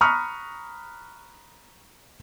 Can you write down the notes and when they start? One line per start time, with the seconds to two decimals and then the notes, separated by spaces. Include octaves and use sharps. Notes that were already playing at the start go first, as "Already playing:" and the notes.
0.01 A#5 B5 C#6 D#6 F6 F#6